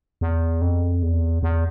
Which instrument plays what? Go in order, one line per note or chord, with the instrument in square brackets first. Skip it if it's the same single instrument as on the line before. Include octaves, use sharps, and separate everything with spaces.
[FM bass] E2
F2
E2
E2